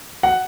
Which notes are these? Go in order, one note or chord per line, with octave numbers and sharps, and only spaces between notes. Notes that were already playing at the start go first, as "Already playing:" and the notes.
F#5